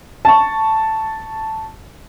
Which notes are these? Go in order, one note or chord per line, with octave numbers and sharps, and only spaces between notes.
A5 C#6